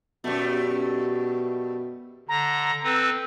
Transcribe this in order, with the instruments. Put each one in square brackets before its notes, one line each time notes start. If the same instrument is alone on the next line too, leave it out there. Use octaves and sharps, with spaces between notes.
[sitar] F#2 G3 A3 [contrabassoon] B2
[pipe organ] D3 [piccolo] A#5
[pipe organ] C4 A4 B4